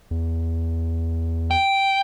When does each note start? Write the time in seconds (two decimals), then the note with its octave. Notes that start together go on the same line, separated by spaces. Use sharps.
0.11 E2
1.51 G5